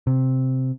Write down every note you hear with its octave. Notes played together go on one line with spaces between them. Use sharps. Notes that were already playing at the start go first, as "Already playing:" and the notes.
C3